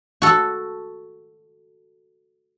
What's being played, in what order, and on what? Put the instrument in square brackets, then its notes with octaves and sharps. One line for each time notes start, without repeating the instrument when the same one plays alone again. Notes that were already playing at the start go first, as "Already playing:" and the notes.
[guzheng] F#4 A4